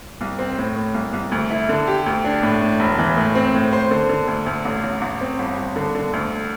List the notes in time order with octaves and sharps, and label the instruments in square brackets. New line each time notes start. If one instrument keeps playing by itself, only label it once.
[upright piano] C2
C4
A2
A2
C2
C2
D2
E4
D3
G4
D2
D4
A2
A2
E1
E3
A2
C4
A2
C5
D3
D3
D2
D2
A1
A1
A1
C4
G1
G1
D3
D3
D2